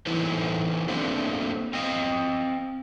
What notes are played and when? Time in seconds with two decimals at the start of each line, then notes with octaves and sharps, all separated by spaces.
0.06 E3 D#4 E4 A4 B4 C5
0.88 A3 A#3 C4 D4 C5
1.73 C4 D#5 F5